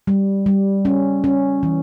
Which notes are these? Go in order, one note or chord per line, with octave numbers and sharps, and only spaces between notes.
G3
G3
C#4
C#4
E3